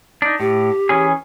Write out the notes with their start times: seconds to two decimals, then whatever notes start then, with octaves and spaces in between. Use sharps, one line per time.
0.22 D4 D#4
0.40 A2 G4
0.89 E3 C#4 G#4